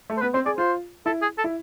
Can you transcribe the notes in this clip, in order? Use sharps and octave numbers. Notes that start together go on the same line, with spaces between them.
A3
C5
B3 B4
C4 C5
G#4 D5
F4 C5
E4 A4
G#4
A4
E4